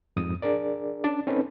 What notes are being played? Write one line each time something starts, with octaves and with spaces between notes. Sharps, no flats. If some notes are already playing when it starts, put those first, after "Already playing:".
F2 G#2 D#6
D4 G#4 A#4 D5
C#4 D4 D5
C4 C#4 D#4 A4 B4